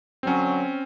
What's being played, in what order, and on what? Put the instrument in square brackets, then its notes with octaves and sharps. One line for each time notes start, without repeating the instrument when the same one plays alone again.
[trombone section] D3 F#3 [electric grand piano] C4 C#4